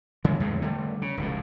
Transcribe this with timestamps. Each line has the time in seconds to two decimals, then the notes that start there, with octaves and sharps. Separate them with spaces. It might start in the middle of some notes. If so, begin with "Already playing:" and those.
0.24 C#3 E3 G#3
0.40 E2 A2 G#3 A3
0.62 D3 G3 A3
1.02 C#3
1.17 F1 C#2 A2